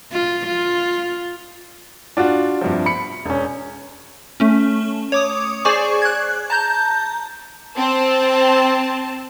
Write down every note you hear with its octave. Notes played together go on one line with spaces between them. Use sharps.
F4
F4
D4 F4 F#4
G2 C3 F3
B5 C#7
E1 C#4
A3 C#4
C#5 D6 D#6
G#4 C5 D5 G#5 C#6 D6
F#6 G#6
A5 A#5 G6
C4 A5